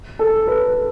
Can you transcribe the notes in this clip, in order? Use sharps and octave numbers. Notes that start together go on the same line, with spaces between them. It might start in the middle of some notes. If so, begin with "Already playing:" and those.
A4
B4